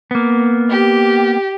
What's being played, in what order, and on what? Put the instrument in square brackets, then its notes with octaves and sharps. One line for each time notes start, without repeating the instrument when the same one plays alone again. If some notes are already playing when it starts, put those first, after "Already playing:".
[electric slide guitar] A#3 B3
[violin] G4